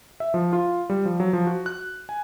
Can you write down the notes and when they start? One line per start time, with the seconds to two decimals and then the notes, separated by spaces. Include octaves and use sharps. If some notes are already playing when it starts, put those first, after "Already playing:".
0.20 E5
0.34 F3
0.53 F4
0.90 G3
1.05 F3
1.20 F#3
1.33 F3
1.47 F#4
1.66 F#6
2.09 G#5